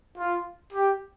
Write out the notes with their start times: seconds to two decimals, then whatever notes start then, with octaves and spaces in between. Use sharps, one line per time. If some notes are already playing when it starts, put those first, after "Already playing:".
0.18 F4
0.73 G4